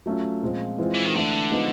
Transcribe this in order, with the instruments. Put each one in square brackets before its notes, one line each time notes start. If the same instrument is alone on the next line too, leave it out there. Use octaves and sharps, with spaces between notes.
[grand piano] F#3 A3 C#4 F4
A#2 F3 G#3 C4
E3 G#3 C4 F4
[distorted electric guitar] E3
D#3
[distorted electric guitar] D3 [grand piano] E3 A3 D4
[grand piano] F3 G#3 B3 D#4